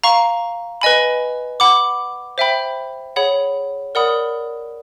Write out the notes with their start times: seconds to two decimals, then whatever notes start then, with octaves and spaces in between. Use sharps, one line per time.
0.04 F5 A#5 C#6
0.81 B4 D#5 G#5 B5
1.60 F#5 B5 D6
2.38 C5 E5 G5 B5
3.16 G#4 C#5 F#5 B5
3.95 A#4 D5 F#5 B5 D#6